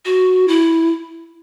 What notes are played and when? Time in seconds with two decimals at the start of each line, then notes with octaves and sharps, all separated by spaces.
0.05 F#4
0.48 E4